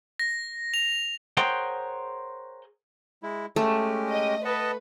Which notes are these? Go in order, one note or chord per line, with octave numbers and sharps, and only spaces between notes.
A#6
F7
G#4 A#4 C5 C#5 F#5 G5
G#3 E4
G#3 A3 C#4 G4
D#5
B4 D#5 F#5 A5